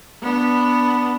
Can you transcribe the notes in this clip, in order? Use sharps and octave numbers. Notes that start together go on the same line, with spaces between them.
B3 D4